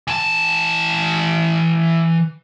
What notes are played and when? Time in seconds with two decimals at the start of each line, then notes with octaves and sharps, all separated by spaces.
0.08 E3 A5